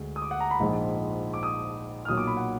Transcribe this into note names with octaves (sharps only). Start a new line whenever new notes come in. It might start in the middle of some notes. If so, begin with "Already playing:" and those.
Already playing: D2 G#3
D#6
D6
F#5
A#5
B5
A#1 G#2 F3 G#3
D6
D#6
F6
B1 A#2 F#3 D#6
D6
B5
F#5